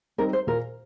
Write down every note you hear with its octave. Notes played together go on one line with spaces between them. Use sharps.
G3 C4 D#4 A#4
C5
A#2 A#4